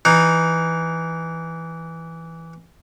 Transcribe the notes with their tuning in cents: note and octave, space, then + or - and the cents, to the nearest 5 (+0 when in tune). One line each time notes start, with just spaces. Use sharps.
E3 +0 D#4 +0